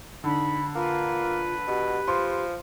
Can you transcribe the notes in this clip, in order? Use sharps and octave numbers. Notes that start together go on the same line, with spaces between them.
D3 D#4 B5
A#3 F4 B4
B2 G4
F3 C6